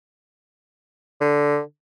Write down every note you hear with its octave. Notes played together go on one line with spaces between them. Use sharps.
D3